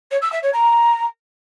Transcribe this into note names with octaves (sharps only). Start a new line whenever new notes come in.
C#5
E6
E5
C#5
A#5